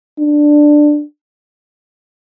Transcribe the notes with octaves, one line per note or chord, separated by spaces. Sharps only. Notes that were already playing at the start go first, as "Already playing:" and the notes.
D4